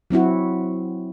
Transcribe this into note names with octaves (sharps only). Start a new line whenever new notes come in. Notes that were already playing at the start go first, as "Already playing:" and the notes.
F#3 C4 E4 F#4